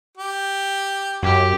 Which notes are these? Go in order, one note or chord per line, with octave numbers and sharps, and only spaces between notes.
G4
F#2 G4